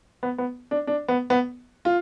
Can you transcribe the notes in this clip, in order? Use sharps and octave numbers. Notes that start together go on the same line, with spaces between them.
B3
B3
D4
D4
B3
B3
F4